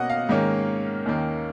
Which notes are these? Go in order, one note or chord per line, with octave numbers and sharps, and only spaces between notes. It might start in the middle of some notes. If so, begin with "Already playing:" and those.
Already playing: B2 A#3 C#4 D#5 F#5
F5
G#2 D#3 A#3 C#4
D#2 D#3 A#3 C#4